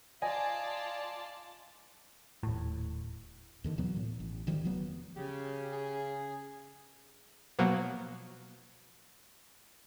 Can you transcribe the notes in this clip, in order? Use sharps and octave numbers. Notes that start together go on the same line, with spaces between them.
F4 D5 D#5 G#5 A5
D#1 A2
D#2 D3 D#3
B2 E3 F#3 B3
A2
A1
D2 D#3 F3 G3
E1 F3 F#3 B3
C#3 G4
G#4
B2 F3 F#3 A#3 B3